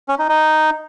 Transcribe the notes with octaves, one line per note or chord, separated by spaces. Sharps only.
C#4
D#4
D#4